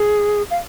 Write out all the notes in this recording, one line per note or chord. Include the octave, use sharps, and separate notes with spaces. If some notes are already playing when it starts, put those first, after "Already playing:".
Already playing: G#4
F5